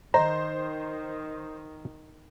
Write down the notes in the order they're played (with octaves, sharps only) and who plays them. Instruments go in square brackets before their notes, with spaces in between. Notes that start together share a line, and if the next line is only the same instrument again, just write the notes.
[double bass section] D#3 [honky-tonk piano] C5 [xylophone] D#5 [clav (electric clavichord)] A#5